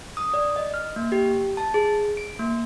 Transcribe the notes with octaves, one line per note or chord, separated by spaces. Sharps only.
D#6
D5
D#5
F6
A#3
G4
A5
G#4
D7
A#3